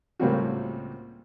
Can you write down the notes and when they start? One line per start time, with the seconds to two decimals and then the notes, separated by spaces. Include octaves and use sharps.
0.20 C#2 A2 G3 A#3 C4 F#4